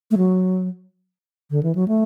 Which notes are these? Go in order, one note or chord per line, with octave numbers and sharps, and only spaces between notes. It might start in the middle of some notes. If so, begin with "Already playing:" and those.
A3
F#3
D3
E3
F#3
A3